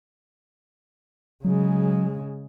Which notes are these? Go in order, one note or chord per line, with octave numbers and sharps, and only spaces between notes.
C#3 F#3 G#3